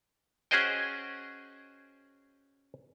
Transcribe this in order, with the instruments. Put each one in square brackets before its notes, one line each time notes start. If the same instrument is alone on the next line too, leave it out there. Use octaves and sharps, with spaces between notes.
[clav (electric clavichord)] C#4 F#4 G#4 C5 D#5 G5